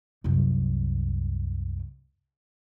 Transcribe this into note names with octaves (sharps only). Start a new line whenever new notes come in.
C2 F#2